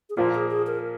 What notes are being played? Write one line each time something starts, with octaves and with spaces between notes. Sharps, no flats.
G#4
A#2 F3 A#3 F4
G#4
G#4
A#4